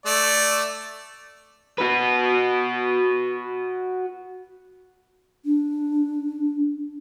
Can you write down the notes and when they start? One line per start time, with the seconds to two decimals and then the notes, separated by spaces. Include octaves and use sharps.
0.06 A3 D5
1.78 F#4 B4
5.45 D4